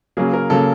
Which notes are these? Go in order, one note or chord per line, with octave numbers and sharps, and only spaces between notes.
C#3 F#3 A#3 G#4
A#4
C#3 F#3 A#3 A4